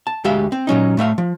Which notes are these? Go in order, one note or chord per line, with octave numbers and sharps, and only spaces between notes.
A5
D2 G#3 G4 E5 F5
C4
A#2 F#3 C#4 D#4
A2 A3 E5 F5
F3